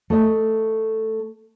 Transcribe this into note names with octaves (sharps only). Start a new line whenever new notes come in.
A3 D#5